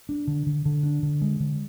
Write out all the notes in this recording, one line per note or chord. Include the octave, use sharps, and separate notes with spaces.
D4
D3
D3
D3
D4
D3
G#3
D3